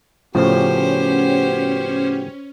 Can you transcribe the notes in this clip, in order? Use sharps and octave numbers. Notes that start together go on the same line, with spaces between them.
A2 C#3 F3 B3 C#4 F#4 G4 C5